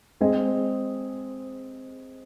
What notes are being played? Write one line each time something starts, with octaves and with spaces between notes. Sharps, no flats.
G#3 C4 G#4 D#5